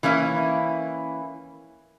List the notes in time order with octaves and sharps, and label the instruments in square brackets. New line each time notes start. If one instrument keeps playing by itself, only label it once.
[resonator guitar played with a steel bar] E3 A#3 C#4 E4